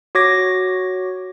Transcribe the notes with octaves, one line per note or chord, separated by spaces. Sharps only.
F#4 C#5 D6 G#6 A#6